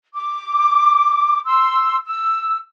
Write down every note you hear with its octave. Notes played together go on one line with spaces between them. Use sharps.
D6
C6 E6
E6